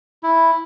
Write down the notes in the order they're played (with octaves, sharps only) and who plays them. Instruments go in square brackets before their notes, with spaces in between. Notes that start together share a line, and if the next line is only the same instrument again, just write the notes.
[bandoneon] E4